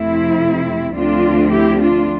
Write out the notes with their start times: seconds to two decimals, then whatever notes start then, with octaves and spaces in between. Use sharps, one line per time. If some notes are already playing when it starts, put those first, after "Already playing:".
Already playing: F2 C3 F3 A3 C4 E4
0.96 D2 D3 F3 A3 C4 D4 F4
1.52 E4 G4
1.82 D4 F4